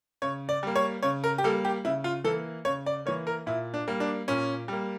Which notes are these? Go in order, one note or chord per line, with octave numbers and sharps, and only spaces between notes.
C#3 C#5
D5
G3 A#3
C#5
C#3 C#5
A#4
G4
G3 A#3 A4
G4
C#3 E4
F4
E3 A#3 A4
C#3 C#5
D5
E3 A#3 C#5
A#4
A#2 E4
D4
G3 A#3
D4
A#2 C#4
G3 A#3